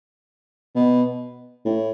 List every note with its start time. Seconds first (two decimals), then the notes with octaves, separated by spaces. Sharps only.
0.75 B2
1.65 A2